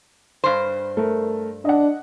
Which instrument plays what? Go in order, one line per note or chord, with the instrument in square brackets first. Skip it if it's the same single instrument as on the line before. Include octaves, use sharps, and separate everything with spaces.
[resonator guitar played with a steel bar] G2 C5
[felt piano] A3 A#4
[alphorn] D4 [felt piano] D#5 F#5